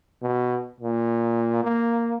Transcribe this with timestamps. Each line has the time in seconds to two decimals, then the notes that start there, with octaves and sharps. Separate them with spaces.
0.22 B2
0.81 A#2
1.64 A#3